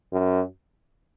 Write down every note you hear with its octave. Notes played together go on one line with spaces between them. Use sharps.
F#2